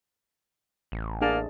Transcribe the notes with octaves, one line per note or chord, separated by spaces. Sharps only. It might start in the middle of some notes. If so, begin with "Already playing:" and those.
A1
A#3 D4 G#4 A5